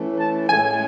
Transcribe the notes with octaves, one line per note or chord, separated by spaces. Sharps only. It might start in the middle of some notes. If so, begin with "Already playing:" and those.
Already playing: E3 A3 C#4
A5
A2 G#3 C#4 G#5